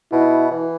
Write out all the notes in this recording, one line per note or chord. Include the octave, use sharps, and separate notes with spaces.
B2 E4
E3